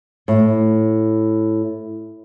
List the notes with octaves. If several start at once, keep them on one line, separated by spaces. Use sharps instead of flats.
A2